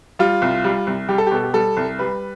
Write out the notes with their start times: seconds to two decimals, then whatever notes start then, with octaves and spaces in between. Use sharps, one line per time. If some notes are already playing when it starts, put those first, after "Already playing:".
0.19 G3 F4
0.42 C2
0.64 G3
0.87 C2
1.09 G3 G4
1.18 A4
1.27 G4
1.31 B2 A4
1.43 G4
1.54 G3 A4
1.77 C2
1.99 G3 B4